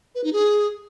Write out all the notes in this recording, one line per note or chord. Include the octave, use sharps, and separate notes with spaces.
B4
D#4
G#4